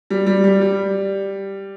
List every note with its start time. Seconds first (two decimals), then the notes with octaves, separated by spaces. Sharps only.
0.10 G3
0.26 G3
0.44 G3
0.61 G3